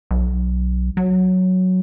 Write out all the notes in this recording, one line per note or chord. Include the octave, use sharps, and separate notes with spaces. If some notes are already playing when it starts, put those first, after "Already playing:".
B1
F#3